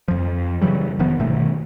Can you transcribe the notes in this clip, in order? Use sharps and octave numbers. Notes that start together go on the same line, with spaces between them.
F2 F3
C#3 E3 F#3 G3
F1 D#3 F3 B3
G1 B2 D#3 A3